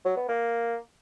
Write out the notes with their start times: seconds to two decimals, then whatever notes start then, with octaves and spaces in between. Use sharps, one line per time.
0.05 F#3
0.17 B3
0.28 A#3